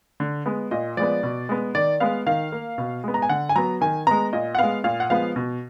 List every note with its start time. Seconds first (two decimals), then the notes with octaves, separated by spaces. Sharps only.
0.20 D3
0.46 G#3 B3
0.71 A#2 D#5
0.97 F3 G#3 B3 D5
1.23 B2
1.49 G#3 B3
1.75 D#3 D5
2.00 G#3 B3 F5
2.26 D#3 F5
2.52 A#3
2.78 B2
3.04 G#3 B3
3.14 A#5
3.22 G#5
3.29 D3 F#5
3.49 G#5
3.55 F#3 B3 A#5
3.81 D#3 G#5
4.07 G#3 B3 A#5
4.33 A#2 D#5
4.55 F#5
4.58 G#3 B3 F5
4.84 A#2 F5
5.00 F#5
5.10 F3 G#3 B3 F5
5.36 B2